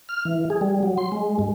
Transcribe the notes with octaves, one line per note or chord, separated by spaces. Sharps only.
F6
E3
G#4
G3
F#3
C6
G#3
G2